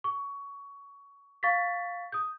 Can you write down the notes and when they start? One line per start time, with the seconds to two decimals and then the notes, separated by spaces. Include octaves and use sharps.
0.04 C#6
1.43 F5 C#6 A6 B6
2.12 D#6 G6